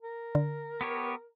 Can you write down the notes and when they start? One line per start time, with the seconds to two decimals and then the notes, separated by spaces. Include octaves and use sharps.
0.02 A#4
0.35 D3
0.81 B3 G4 C#5